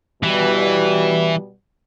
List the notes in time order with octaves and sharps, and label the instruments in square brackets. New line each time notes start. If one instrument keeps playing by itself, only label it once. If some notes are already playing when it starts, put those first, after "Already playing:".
[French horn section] B2 G3 [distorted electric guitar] E3